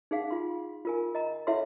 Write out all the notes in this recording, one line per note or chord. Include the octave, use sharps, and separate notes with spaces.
D#4 G#4 F5 F#5
F4 C6
F4 A#4 G#5
D#5 A#5
E4 A4 C#5 E5 F#5 C6